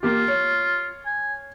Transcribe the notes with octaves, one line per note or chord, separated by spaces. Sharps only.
A#3 F4 G4
C#5
G#5